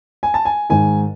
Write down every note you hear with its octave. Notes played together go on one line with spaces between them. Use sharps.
G#5
A5
G#5
G#2 D#3 G#5